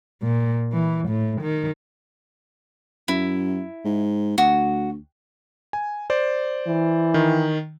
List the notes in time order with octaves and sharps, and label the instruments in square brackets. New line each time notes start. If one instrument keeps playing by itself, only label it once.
[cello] A#2
E3
A2
D#3
[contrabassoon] F#2 [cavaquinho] E4
[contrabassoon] G#2
[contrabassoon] D2 [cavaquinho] F#4
[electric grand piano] G#5
C5 D5
[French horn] E3
[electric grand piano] D#3